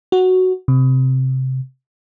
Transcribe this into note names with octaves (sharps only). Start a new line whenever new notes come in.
F#4
C3